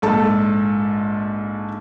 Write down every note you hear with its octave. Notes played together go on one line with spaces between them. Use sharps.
A#1 G#2 A4 A5